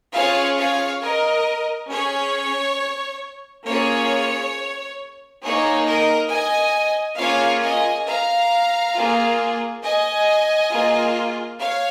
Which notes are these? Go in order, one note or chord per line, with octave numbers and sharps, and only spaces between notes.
C#4 F4 G#4 C#5 F5
C#5 F5
A#4 D#5
C#4 G#4 C#5
A#3 C#4 F4 G#4 C#5
A#3 D#4 G#4 C#5
A#4 D#5
D#5 G#5
A#3 C#4 F4 G#4 C#5 F5
D#5 G#5
F5 A#5
A#3 F4 G#4
D#5 G#5
A#3 F4 G#4
C#5 F5